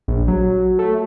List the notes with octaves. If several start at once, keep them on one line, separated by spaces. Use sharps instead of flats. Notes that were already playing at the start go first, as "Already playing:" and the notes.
A#1
F#3
A3